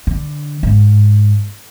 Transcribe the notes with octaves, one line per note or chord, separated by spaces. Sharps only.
D3
G#2